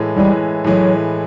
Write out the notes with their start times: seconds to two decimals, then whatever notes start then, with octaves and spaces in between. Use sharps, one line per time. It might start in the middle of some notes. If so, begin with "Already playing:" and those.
Already playing: A2 E3 G#3
0.16 A2 E3 G3 G#3
0.64 A2 E3 F#3 G#3